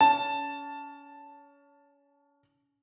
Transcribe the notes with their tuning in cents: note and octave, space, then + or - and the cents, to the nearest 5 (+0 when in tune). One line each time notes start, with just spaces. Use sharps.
C#4 +30 A5 +0